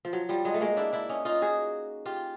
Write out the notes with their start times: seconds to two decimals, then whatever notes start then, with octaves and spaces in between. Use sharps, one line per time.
0.05 F3
0.13 F#3
0.29 F3 G3
0.45 F#3 G#3
0.54 A3
0.61 G#3 A#3
0.77 D4 E4
0.93 D4 E4
1.09 C#4 D#4
1.25 D#4 F4
1.42 F#4 G#4
2.06 F4 G4